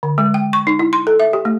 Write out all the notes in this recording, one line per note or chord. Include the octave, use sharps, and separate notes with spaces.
D3
G#3
G5
C#6
D#4
E4
C6
A4
E5
G4
A3